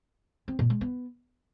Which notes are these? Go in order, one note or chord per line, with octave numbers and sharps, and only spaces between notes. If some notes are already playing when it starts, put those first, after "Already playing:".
C4
A#2
G#3
B3